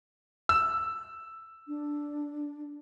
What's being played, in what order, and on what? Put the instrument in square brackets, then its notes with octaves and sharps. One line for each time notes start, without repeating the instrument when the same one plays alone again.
[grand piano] E6
[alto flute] D4